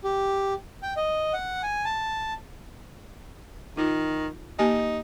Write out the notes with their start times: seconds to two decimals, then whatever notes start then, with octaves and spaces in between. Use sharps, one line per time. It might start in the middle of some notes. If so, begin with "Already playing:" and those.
0.04 G4
0.83 G5
0.97 D#5
1.33 F#5
1.63 G#5
1.85 A5
3.77 D#3 D#4 F4
4.59 A#3 D#4 G4 G#5